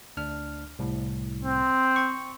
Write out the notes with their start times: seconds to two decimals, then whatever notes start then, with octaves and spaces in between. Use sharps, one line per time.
0.17 D2 D4 F6
0.79 C2 A2
1.44 C4
1.96 G5 C#6